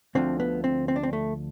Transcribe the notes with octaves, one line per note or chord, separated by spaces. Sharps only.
D2 D3 F3 C4
B3
C4
C4
D4
C4
A3